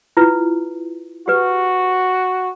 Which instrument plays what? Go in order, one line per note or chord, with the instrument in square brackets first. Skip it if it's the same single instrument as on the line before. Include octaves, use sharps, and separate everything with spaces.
[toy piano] E4 F4 B4
[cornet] F#4 [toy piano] G4 B4